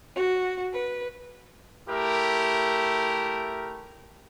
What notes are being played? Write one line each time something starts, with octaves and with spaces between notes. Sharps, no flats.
F#4
B4
A3 E4 G4 A#4